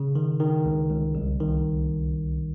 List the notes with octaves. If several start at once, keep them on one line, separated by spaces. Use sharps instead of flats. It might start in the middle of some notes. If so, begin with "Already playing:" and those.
Already playing: C#3
D#3
D#3
C#2
C#2
C2
D#3